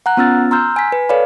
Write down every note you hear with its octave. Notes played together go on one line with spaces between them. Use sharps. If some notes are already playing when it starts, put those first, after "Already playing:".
F#5 A#5 F#6
B3 C#4 F4 E6 F6 A6
A#5 C6 E6 F6 G6
G#5 B6
B4
A4 B4 C#5 D5 F5 B5